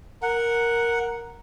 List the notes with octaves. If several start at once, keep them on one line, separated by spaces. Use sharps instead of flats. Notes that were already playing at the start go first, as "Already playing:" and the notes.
A#4 F#5